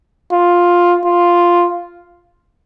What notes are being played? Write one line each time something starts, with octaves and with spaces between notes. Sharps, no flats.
F4
F4